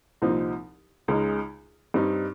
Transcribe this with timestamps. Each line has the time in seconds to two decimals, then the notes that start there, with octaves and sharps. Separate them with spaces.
0.22 C2 A#2 F3 C4 D#4
1.08 C#2 C#3 G#3 D#4
1.94 G2 G3 C4 D#4